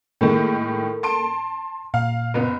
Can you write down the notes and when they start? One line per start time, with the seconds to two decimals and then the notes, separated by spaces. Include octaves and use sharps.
0.21 A2 D#3 G#3 A#3 A4 A#4
1.03 A5 C6 D7
1.94 A#2 F5
2.34 F#1 B3